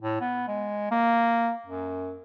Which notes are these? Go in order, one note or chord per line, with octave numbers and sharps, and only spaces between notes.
A2
B3
G#3
A#3
F#2